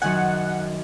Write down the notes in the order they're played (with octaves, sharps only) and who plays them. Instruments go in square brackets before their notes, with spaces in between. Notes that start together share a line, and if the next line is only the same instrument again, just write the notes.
[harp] F#2 D#3 G#5 [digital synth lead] F#5